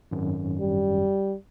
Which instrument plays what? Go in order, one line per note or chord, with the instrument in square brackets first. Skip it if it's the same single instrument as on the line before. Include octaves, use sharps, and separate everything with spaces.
[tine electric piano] G#1 F#2
[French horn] G3